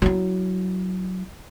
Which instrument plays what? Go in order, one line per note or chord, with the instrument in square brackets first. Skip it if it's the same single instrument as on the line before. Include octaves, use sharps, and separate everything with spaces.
[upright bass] F#3 E4